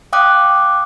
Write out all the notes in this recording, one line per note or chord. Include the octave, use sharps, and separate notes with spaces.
F5 G5 D6 D#6 F#6